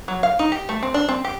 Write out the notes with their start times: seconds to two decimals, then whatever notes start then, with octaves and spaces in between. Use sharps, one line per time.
0.08 F#3
0.23 F5
0.39 D#4
0.52 G4
0.69 A3
0.82 C4
0.94 D4
1.09 C4
1.24 G4